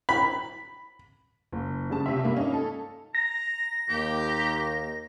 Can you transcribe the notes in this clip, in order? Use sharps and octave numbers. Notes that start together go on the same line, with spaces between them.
B5
F#1
G2 C#3 A5
C3 E5
G2 A#3 F4
C#4 D#4 F5
A4
A#5 A#6
D#2 A#3 G4